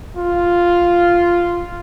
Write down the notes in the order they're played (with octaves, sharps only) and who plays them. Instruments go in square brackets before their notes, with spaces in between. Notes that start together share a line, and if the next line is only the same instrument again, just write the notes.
[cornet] F4